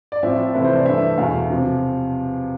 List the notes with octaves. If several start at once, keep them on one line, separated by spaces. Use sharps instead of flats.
D5
A2 F3 C4 F4 E5
C3 E3 A3 E4 B4
C5
D5
G2 E3 A3 E5
E2 B2 A3 E4 F5
C3 F3